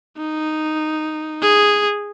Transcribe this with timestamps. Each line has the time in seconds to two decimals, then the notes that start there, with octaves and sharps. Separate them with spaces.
0.18 D#4
1.42 G#4